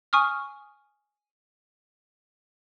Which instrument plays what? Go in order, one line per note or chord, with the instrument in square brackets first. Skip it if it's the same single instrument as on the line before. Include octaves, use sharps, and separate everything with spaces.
[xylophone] G#5 C#6 D#6 F6